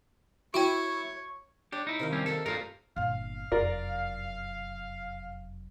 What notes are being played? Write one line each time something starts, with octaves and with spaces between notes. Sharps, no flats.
E4 F#4 C#5 G5
D4 G4 C#5
D#4 E4
C3 D#3 F5
G3 C4 C#4
A#3 A4 A#4 E5
G2 G3 A3 F4 A#4 E5
G1 A#2 F5
F1 F#2 F4 A#4 D5